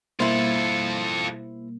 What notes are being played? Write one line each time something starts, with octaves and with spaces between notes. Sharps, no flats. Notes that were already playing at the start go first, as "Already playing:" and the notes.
B2 G3 A#3 E4 F4 A4 C5